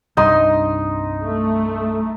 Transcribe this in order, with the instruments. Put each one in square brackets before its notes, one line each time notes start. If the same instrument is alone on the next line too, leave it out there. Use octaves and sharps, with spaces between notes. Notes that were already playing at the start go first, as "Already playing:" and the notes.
[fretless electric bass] C2 G2 [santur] D#4 C6 D#6
[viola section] A3